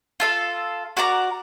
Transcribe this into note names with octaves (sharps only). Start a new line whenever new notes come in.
F4 A4 F5
F#4 A#4 D5 A#5